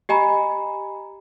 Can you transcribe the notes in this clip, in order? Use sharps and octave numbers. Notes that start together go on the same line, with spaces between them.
G4 D#5 G#5 A#5 B5